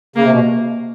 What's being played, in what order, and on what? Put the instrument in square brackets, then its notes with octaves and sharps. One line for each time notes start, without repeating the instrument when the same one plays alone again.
[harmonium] C#3 [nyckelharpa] A#3
[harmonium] C3
B2